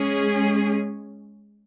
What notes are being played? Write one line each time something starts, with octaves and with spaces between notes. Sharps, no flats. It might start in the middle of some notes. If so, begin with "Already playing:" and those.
Already playing: G#3 C#4 G#4